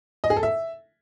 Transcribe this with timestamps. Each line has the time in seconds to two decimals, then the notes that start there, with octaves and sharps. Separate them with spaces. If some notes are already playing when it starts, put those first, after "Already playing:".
0.24 D#5
0.30 G#4
0.36 A4
0.43 E5